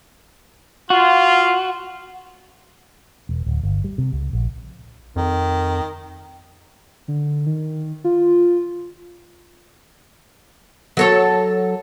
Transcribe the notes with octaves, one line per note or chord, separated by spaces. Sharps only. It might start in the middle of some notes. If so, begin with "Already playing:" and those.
F4 F#4
E1
D1
G1
G3
C3
C#2
A#1
F2 D#3
D3
D#3
F4
F#3 A4 C#5